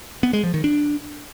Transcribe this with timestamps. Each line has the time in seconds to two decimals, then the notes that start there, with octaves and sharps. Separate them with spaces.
0.23 B3
0.33 G#3
0.44 F3
0.54 D#3
0.64 D4